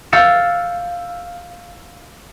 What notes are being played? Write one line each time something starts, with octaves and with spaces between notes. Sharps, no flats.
F5 E6 G6 A6 C#7 E7